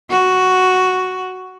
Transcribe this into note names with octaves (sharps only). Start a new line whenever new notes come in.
F#4